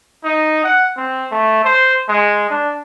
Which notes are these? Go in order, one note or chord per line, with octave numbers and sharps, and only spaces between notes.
D#4
F#5
C4
A3
C5
G#3
D4